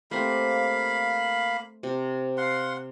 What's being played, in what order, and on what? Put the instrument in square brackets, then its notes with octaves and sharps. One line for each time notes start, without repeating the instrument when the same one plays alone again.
[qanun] A3 C4 G4 [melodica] A#3 F5 B5
[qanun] C3
[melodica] F5 F#5 C6